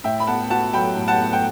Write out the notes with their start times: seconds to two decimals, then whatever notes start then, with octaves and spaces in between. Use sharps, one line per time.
0.04 A2 E5 G5
0.20 B5
0.27 B3 F#5 A5
0.50 F#4 F#5 A5
0.73 F#3 G5 B5
0.96 A2
1.08 F#5 A5
1.20 B3
1.33 G5